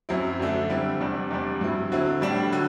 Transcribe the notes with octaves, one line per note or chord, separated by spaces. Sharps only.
F#2 F#3 C4 E4
F#2 D3 A3 D4
D3 G3 C4 E4
E2 C3 G3 D4
E2 C3 G3 D4
G2 F#3 C4 E4
D3 F#3 C4 E4
A2 G3 D4
D3 F#3